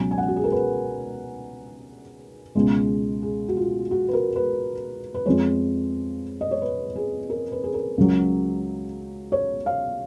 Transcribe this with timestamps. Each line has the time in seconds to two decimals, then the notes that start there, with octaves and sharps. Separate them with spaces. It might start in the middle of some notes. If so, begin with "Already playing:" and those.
Already playing: C#2 B2 F#3 G#5
0.11 G#5
0.18 F#5
0.28 F#4
0.36 G#4
0.44 A#4
0.52 B4
2.55 C#2 B2 G#3
3.22 G#4
3.49 F#4
3.57 F4
3.91 F#4
4.08 B4
4.13 A#4
4.36 B4
5.14 B4
5.25 F2 F3 G#3 C#5
6.41 D#5
6.51 C#5
6.62 B4
6.96 G#4
7.30 A#4
7.52 B4
7.64 G#4
7.74 A#4
7.97 C#2 C#3 F#3
9.32 C#5
9.66 F5